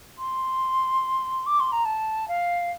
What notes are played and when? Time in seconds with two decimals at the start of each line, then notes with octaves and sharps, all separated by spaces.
0.18 C6
1.46 D6
1.60 C6
1.72 A#5
1.85 A5
2.28 F5